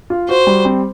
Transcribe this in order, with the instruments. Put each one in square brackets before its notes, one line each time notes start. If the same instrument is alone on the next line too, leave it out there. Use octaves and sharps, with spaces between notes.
[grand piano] F4
[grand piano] F#4 [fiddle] C5
[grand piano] G3
C4